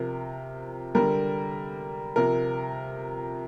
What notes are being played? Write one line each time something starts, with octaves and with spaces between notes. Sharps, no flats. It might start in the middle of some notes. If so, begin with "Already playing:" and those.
Already playing: C3 F3 A#4
D3 G3 A#4
C3 F3 A#4